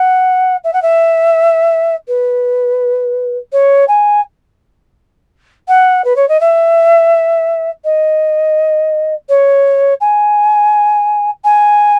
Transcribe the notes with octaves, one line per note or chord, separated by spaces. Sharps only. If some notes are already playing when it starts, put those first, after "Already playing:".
Already playing: F#5
E5
F#5
E5
B4
C#5
G#5
F#5
B4
C#5
D#5
E5
D#5
C#5
G#5
G#5